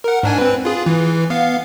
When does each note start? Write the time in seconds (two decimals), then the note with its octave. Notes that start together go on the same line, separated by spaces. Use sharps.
0.04 A#4 F#5
0.23 G#2 D4 G#5
0.38 C4 B4
0.65 F4 G#4
0.86 E3
1.30 B3 F5